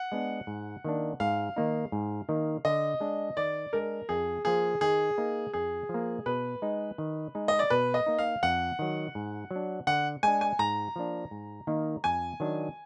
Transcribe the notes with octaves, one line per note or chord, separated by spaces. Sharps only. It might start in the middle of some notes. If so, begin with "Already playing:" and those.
Already playing: F#5
G#3 B3 D4
G#2
D#3 A#3 D4
G#2 F5
D#3 A#3 D#4
G#2
D#3 A#3 D#4
D3 D#5
G#3 D4
D#3 D5
G#3 D4 A#4
F2 G#4
F3 A#3 G#4
D#3 G#4
A#3 D#4
F2 G#4
F3 A#3
B2 B4
G#3 D#4
D#3
G#3 D#4
D#5
D5
B2 B4
D#5
A#3 D#4
F5
F2 F#5
D#3 F#3
G#2
F#3
D4
D3 F#5
G#3 D4 G#5
G#5
G#2 A#5
F3 A#3 D4
G#2
D#3 A#3 D#4
F2 G#5
D#3 F#3 D4